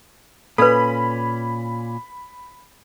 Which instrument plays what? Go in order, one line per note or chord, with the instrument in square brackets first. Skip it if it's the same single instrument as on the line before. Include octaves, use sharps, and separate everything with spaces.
[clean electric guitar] A#2 C#4 [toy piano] A4 B4 [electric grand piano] B5